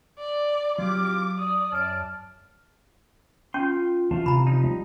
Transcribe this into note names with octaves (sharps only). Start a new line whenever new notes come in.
D5
F#3 C4 F4 G4 D6
D5 D#6
F#2 A5 F6 D7
C#4 F4 C6
E3 F4 F5 A5
C3 A#5 B5
F3 D#4
G3